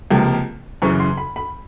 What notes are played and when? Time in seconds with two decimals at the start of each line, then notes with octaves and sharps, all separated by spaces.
0.10 C#2 C3 F3 A#3
0.82 F#2 C#3 E3 C#6
1.00 C6
1.18 B5
1.36 B5